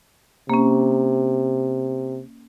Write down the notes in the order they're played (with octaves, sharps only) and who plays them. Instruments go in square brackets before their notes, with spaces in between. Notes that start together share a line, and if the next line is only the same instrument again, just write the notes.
[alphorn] C3 [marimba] A#3 C#4